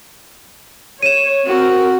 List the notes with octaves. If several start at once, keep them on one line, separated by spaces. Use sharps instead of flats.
C#5 D#7 E7
C4 F#4 A#4